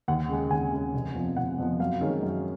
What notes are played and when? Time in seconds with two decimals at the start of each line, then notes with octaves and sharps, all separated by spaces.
0.08 D#2 F#5
0.29 C#3 G#3
0.51 D#2 G#5
0.72 C#3 G#3
0.94 F1
1.15 F2 F3 B3
1.37 F1 F#5
1.58 F2 F3 B3
1.80 F#2 F5
2.01 D#3 G#3 C#4
2.23 F#2